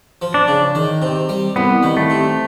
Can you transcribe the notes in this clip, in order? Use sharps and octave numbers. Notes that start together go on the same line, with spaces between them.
F3
D4
C#3
D#3
C3
G3
C2 B3
D#3
A3
C3